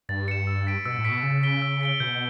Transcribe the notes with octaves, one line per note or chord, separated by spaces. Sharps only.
G2 A6
C#7 E7
E6
B6 D7
B2 E6
A2
B6 D7
B2
C#3 E6
B6 D7 G7
E6
B6 D7 G7
B2 G6